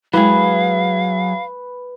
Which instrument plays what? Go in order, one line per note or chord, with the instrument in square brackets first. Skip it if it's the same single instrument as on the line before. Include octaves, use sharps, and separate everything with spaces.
[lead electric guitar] F#3 G#4 [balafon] G#3 E4 [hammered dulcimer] B4 [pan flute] F5